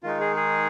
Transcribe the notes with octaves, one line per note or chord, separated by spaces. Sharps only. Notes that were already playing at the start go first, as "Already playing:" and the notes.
D#3 G#3 D#4 F4
G#4
G#4